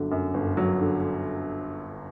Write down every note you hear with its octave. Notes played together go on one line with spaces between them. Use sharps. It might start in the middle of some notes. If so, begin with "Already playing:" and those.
Already playing: G1 D3 F#3
F#2
G1
F#3
D3